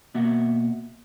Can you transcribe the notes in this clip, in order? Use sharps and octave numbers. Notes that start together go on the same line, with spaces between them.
B2 A#3 F#4 E5 F#5